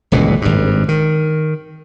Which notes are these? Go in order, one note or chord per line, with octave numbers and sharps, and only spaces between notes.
D#1 C#2 B2 E3
G#1 G2
D#3